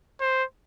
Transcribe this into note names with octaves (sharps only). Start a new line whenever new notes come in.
C5